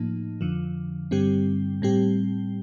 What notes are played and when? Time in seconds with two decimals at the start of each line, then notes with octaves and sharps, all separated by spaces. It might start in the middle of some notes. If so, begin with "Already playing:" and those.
Already playing: A2 F3 A#3 D#4
0.41 F2 D3 F3
1.11 G2 D3 G3 C4 G4
1.82 A2 G3 C4 G4